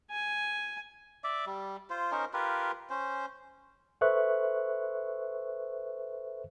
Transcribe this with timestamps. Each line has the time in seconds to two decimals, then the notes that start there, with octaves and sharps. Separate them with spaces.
0.11 G#5
1.24 D5 E5 D6
1.46 G3
1.90 F4 C5
2.12 C#4 D#4 A#4 C5
2.33 F4 G4 A#4 B4
2.90 C#4 C5
4.01 A4 B4 C5 E5 C#6 F#6